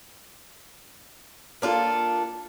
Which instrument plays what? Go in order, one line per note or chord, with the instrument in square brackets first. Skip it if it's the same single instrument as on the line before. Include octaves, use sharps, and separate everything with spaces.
[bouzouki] A#3 D4 F4 A4